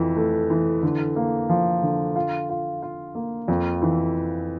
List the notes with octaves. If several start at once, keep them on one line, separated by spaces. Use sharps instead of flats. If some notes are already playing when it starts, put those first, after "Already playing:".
Already playing: F2 E3
A3
E3
D3
A#3
F3
D3
F4
F4
F4
A#3
F2
E3